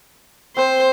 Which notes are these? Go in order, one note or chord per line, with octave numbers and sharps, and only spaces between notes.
C4 C5